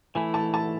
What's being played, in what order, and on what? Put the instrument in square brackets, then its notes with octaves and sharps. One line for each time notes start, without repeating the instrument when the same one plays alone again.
[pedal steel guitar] E3 A3 E4 [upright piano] G#5
[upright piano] A5
A5